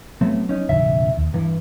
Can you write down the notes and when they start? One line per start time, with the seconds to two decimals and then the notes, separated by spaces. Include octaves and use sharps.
0.21 A2 F#3 G#3 A3 B3 C4
0.49 C#4 D#4
0.69 F1 A#1 D3 E5
1.17 D#2
1.34 G2 E3